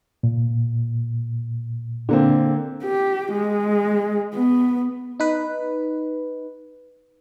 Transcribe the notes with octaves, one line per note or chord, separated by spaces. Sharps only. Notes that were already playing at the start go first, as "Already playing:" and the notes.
A#2
D3 A#3 C4
G4
G#3
B3
D#4 B4